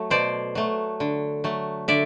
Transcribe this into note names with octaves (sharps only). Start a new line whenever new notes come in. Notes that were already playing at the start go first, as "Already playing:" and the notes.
Already playing: F#3 A3
B2 C5 D5
F#3 A3
D3
F#3 A3
D3 D5 E5